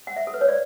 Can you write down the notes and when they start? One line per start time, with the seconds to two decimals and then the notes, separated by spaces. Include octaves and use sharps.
0.07 F#5
0.16 E5
0.27 A4
0.34 B4
0.41 C#5
0.48 D5